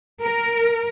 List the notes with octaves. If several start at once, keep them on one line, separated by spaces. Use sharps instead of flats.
A#4